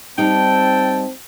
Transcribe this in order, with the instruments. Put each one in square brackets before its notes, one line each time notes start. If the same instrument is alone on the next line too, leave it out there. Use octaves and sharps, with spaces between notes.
[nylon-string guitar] G3 D#4 [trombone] C4 [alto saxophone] G5 [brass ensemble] A5